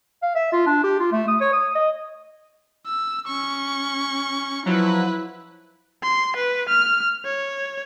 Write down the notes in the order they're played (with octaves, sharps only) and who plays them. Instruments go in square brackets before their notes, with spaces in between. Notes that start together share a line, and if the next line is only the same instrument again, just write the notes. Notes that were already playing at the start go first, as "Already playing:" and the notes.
[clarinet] F5
E5
F4
D4
G4
F4
A3
D#6
C#5
D#6
D#5
[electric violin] E6
C#4 C#6
[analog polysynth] F3 F#3 [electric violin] E4 B4
[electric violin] C6
B4
F6
C#5